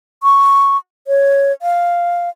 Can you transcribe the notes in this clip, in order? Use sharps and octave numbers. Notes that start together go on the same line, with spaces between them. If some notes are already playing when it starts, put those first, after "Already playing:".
C#6
C#5
F5